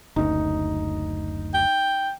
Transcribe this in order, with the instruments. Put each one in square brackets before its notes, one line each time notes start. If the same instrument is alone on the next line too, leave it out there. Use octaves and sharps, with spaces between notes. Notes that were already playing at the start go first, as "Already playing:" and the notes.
[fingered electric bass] F#1 D2 [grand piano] D#4
[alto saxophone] G5